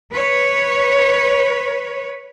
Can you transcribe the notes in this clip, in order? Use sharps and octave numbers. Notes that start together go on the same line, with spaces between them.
B4 C#5